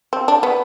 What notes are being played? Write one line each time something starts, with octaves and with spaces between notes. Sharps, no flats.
C4
D4
B3